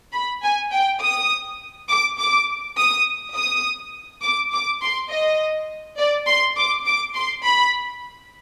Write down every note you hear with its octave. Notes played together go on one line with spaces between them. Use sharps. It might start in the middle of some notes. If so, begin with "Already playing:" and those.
B5
G#5
G5
D#6
D6
D6
D#6
D#6
D6
D6
C6
D#5
D5
C6
D6
D6
C6
B5